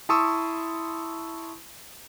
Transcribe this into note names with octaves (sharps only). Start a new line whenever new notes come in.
E4 A5 C6 C#6 D#6 E6